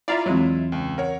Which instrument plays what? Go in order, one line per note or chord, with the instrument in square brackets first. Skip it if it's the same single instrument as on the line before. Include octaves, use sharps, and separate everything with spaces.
[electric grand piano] E4 F4 E5 [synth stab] D5 F5 A#5
[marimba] E2 E3 C4 [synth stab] F#3 G#3
[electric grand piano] C#2
[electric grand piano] A#4 C#5 [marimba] F#5